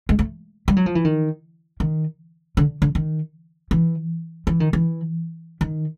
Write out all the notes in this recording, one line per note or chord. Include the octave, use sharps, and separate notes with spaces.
G#3
A3
G3
F#3
F3
E3
D#3
D#3
D3
D3
D#3
E3
E3
D#3
E3
D#3